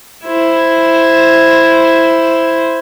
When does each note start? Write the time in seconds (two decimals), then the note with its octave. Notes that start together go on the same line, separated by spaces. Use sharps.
0.25 E4 C5